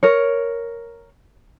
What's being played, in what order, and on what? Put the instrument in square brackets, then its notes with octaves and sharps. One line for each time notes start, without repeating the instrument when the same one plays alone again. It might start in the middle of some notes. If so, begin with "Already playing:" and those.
[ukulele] A#4 C#5